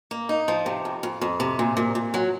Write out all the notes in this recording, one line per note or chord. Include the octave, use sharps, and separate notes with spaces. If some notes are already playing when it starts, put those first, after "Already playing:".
A#3
D#4
F3
C3
F2
F2
F2
C3
A#2
A#2
A#2
F#3